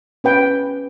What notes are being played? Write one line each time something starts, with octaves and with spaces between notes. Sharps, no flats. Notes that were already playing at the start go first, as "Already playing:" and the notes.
C#4 B4 G5